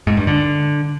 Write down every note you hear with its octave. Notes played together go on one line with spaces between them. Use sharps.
G#2
G2
D3